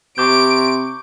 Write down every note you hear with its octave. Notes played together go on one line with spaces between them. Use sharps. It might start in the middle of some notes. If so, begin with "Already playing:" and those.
C3 C#6 D6 G6 D7